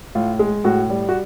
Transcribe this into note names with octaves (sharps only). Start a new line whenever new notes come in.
A2 F4
G#3
A2 F#4
G3
F#4